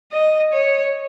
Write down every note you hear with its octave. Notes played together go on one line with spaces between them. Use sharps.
D#5
C#5